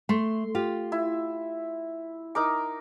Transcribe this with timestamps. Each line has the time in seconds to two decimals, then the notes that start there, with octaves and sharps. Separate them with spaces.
0.09 A3 C6
0.55 F4 G4
0.92 E4
2.35 D#4 A#4 D6